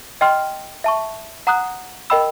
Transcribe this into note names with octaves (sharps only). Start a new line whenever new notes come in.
D#5 G5 C6 F6
E5 A5 C#6
F#5 A#5 D#6 F#6
A#4 D#5 G5 B5 E6